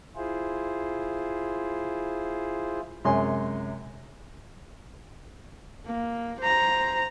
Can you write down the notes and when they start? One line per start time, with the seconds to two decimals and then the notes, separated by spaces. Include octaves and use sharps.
0.16 E4 F4 G#4 C5
3.04 F#2 C3 G#3 C#5 G#5 C6
5.86 A#3
6.40 C5 A#5